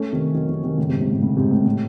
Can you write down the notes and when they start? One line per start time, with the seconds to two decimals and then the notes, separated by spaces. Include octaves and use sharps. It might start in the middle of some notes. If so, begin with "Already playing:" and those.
Already playing: A3 C#4
0.12 C3 D#3
0.34 D#3 F#3
0.49 C3 D#3
0.63 C3 D#3
0.78 A2 C#3
0.89 G#2 C3
1.00 G#2 C3
1.11 A2
1.22 A2 C#3
1.37 G#2 C3
1.51 A2
1.66 A2